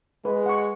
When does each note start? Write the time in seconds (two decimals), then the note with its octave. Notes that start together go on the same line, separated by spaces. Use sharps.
0.25 G#3 B4
0.46 F#5 C#6